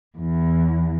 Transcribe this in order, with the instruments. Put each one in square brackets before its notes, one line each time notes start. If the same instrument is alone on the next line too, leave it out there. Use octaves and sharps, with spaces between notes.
[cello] E2